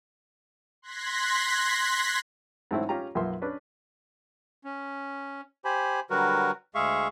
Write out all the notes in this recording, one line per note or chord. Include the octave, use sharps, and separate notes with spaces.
C6 F#6 G#6 A#6 B6
G#2 F#3 A3 C4 C#4 E4
C#4 F4 G4 A#5
B1 F#2 F3 A#3 E5 C6
C#4 D4 B4
C#4
G4 C5 G#5 B5
D3 F#3 G3 F#4 A#4 B4
D2 G#3 G#4 E5 F5 C#6